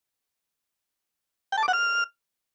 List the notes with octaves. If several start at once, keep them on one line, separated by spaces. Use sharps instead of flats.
G5
A5
D6
F#5
F6